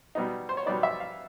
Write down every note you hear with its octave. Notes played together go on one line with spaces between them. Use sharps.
B2 G3 B3 D#4
C5
C#5
B2 G3 B3 D#4 D5
E5
F5